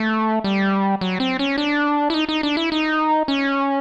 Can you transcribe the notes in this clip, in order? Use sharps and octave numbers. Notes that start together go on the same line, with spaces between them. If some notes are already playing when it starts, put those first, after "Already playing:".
Already playing: A3
G3
F#3
C4
C#4
D4
E4
D#4
D#4
D4
E4
D#4
C#4